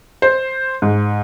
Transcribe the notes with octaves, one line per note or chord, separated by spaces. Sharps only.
C5
G#2